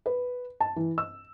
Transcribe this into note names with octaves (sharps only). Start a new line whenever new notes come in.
B4
A5
E3
E6